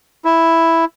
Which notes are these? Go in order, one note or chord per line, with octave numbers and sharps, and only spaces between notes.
E4